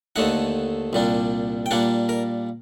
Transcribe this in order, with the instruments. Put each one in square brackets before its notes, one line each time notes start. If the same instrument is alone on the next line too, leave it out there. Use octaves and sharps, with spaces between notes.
[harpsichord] D#2 D3 A3 D#4 F#5
C2 A#2 G3 D4
G5
A#2 G3 A#3 D4 F#5
A#4